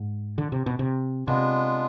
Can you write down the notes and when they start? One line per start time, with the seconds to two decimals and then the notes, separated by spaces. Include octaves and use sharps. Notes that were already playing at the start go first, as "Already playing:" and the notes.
Already playing: G#2
0.38 D3
0.52 C3
0.66 B2
0.79 C3
1.27 C3 G#3 B3 D4 F4